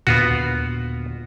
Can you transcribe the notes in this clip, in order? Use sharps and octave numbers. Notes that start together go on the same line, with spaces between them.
D#2 A#2 D3 B3 F4 F#4